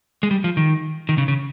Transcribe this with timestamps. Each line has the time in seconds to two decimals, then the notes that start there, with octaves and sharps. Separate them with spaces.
0.23 G#3
0.31 G3
0.44 F3
0.57 D#3
1.09 D#3
1.18 C#3
1.28 C#3